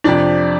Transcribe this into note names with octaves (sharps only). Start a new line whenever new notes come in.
F2 C3 F3 D4 D5